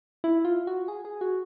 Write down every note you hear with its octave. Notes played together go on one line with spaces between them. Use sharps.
E4
F4
F#4
G#4
G#4
F#4